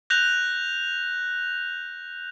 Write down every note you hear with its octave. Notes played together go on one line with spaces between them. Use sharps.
F#6 G6 A#6 F7